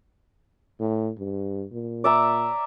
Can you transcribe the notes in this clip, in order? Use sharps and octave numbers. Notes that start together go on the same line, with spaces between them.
A2
G2
A#2
D5 E5 A#5